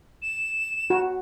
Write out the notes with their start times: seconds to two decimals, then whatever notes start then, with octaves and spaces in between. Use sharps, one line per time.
0.22 E7
0.90 F#4